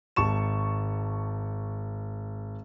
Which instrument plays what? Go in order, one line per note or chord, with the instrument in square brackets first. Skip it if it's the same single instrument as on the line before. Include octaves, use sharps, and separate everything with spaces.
[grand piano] G#1 A5 C#6 E7